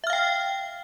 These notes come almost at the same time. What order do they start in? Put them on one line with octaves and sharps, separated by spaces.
E5 F6 F5 G5